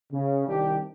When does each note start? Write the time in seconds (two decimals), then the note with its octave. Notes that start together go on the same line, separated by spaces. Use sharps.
0.12 C#3
0.48 C2 D#3 G3 D4 D#4 G4